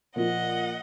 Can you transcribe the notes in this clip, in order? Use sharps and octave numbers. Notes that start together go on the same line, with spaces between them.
A#2 F3 A#3 F4 D#5 F#5